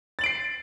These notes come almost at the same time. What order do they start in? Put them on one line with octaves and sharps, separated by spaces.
A6 F#7 D7 C7